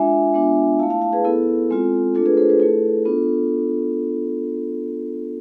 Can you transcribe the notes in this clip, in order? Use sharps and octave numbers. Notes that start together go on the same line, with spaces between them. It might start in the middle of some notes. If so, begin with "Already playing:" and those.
Already playing: G#3 D4 F4 E5 G#5
G#3 B3 D4 F4
A3 E4 F5 A5
F5 A5
F5 A5
G#4 B4
B3 E4 A4
G#3 C4 F4
A3 D4 F4 A4
G#4 B4
A4 C5
G#4 B4
A3 E4 A4
B3 D4 F4